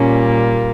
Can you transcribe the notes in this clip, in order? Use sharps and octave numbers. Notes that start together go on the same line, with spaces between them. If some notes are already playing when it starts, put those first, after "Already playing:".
Already playing: A#2 G3 A#3 C#4